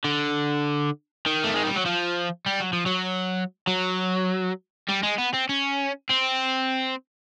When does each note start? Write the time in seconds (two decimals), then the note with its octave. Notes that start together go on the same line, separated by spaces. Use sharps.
0.04 D3
1.26 D#3
1.44 A3
1.55 G#3
1.65 G3
1.76 F#3
1.85 F3
2.46 G3
2.60 F#3
2.73 F3
2.86 F#3
3.67 F#3
4.89 G3
5.03 G#3
5.18 B3
5.34 C4
5.49 C#4
6.09 C4